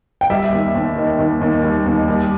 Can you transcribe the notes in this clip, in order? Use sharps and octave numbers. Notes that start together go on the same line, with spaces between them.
G5
G3 E5
D#2
D#2
D#3
D#2
D#2
G3
D#2
G3